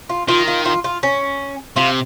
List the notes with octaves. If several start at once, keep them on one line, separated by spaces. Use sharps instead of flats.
F4
D#3 F4
F4
F4
F4
C#4
C3 F4